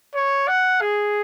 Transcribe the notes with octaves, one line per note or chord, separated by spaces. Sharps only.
C#5
F#5
G#4